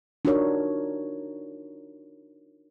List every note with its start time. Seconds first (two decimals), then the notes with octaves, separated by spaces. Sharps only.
0.25 D4 D#4 F4 F#4 A#4 C#5